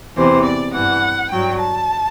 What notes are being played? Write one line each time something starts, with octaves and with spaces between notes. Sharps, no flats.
E2 C3 E3 C5
D5
G2 E3 F#5
G2 F#3 G5
A5